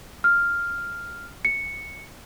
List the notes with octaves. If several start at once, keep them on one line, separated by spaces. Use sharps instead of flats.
F6
C#7